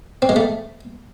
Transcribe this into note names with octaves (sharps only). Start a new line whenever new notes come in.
C4
G#3
A3